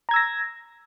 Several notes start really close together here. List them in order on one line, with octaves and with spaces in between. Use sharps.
A#5 G#6 E6 A#6